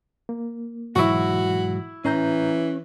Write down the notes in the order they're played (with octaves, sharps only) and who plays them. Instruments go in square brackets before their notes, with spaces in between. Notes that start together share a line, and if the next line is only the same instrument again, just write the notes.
[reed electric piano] A#3
[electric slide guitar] G#2 F#3 [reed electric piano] B2 E3 [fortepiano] E4 C#6 [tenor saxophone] F#4
[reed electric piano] A2 A#5 G6 [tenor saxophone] E3 [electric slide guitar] C#4